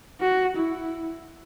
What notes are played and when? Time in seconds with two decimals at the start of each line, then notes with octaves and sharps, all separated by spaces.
0.21 F#4
0.57 E4